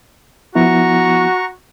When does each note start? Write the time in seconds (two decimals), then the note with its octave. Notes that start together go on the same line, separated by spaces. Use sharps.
0.55 F3 B3 E4 F#4 A#5 C#6